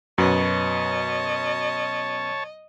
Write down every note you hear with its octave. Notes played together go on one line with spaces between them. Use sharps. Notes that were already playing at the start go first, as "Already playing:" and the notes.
F#2 B2 B3 C#4 C#5 D#5 A5